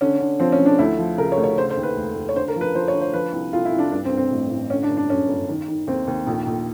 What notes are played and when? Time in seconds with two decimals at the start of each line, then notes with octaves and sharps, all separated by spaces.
0.01 D3 C#4
0.20 D3
0.39 F3 C4
0.52 C#4
0.60 F3
0.65 D4
0.79 D2 E4
0.99 F3
1.18 C#3 A#4
1.32 C#5
1.37 D2
1.44 C#5
1.58 C#3 C5
1.70 C5
1.77 D#2
1.83 B4
1.96 F1
2.15 F1
2.29 C#5
2.35 D3 C5
2.48 A#4
2.56 F3
2.61 B4
2.74 F3 C5
2.88 C#5
2.94 D3
3.01 C5
3.13 F3 B4
3.33 C2
3.53 C2 F4
3.65 E4
3.72 C2
3.78 D4
3.92 G2 D4
4.05 C4
4.11 G2
4.17 C4
4.31 A1
4.50 A1
4.70 D3 C#4
4.83 D4
4.89 G1
4.97 D4
5.10 F#2 C#4
5.28 G1
5.48 D#3
5.68 D#3
5.87 D#2 C4
6.07 D#2
6.27 A#1
6.46 A#1